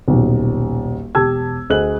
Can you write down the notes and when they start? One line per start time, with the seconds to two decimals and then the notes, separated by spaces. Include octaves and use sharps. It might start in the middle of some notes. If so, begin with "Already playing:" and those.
0.08 D#1 B1
1.15 E1 G4 A5 E6 G#6
1.70 D2 G#4 D#5 F#6 F#7